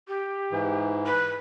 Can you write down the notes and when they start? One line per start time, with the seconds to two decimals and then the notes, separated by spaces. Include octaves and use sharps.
0.08 G4
0.51 G#2 E3
1.06 B4